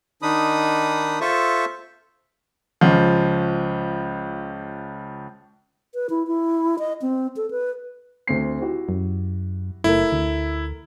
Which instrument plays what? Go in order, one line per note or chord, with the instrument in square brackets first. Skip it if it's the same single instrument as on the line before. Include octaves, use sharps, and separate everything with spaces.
[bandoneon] D#3 D4 D#4 B5 D#6
F4 A4 C5 E5 A5 C#6
[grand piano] C#2 F3
[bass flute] B4
E4
E4
D#5
C4
A4
B4
[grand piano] D2 C4 C7
E4 F#4 G4
[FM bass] F#2
[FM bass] F#1 [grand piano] A3 A#4 [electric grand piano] E4
[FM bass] D2